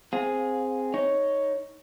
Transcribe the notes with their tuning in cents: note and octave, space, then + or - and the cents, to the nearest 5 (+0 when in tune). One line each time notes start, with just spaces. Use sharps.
C4 +0 G#4 +0 F5 +40
D#4 +0 C#5 +0